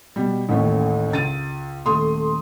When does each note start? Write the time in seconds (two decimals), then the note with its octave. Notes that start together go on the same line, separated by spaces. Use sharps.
0.16 B2 G3
0.49 A1 D#2 A2 C#4
1.12 C#2 A6 D#7
1.85 D#1 A3 C6 D#6